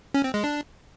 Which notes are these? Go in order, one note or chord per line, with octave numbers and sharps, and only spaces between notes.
C#4
C4
G#3
D4